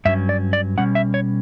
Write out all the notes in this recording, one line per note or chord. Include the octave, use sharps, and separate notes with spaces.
G2 F#3 C#4 E5
D5
D5
B2 G3 C#4 F#5
E5
C#5